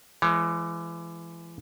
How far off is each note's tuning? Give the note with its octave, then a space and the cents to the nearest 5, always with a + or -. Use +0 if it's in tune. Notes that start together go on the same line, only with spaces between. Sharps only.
E3 +30 G#3 +20 C#5 -20